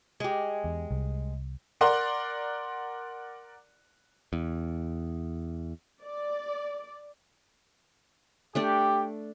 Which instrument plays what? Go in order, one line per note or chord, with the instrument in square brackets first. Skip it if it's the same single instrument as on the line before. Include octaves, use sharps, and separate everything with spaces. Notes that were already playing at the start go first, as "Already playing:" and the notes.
[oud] G#3 G4
[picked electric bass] E2
C2
[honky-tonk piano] A#4 D5 F#5 C6
[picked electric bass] E2
[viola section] D5
[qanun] A3 D4 D5 [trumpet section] G4